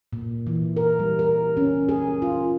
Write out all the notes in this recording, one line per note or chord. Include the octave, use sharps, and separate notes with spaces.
A#2
E3
A#4
G3
A#4
C#4
G#4
F4